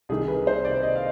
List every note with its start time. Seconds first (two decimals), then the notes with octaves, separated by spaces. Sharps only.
0.09 C2 C3 D#3 G#4
0.28 B4
0.47 C5
0.65 D5
0.83 D#5
0.96 F5